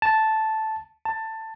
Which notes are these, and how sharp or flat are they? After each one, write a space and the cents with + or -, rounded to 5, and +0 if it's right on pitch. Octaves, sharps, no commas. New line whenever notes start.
A5 -5
A5 +15